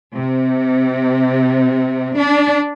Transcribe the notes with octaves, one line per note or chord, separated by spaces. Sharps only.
C3
D4